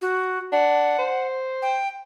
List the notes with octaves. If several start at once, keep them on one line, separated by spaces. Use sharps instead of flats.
F#4
D4 F#5
C5
G5